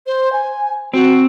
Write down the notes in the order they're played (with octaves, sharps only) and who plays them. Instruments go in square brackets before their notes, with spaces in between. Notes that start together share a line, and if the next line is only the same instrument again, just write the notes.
[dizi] C5
G#5
[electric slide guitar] C4 [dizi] F#4